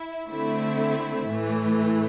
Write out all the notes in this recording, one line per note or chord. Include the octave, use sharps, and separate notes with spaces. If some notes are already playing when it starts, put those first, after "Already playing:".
Already playing: E4
D3 A3 C4 E4
A2 E3 A3